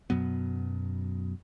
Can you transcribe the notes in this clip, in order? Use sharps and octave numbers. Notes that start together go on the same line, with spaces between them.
F#2 B2 F#3 B3